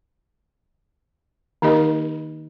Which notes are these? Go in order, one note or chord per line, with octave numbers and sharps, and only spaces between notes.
D#3 A#3 D#4 G4 A#4 D#5